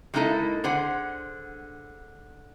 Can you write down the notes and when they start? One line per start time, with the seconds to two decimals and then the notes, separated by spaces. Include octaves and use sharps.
0.14 G3 G#3 A#3 D#4 E4 A4
0.64 D3 G#4 C5 F#5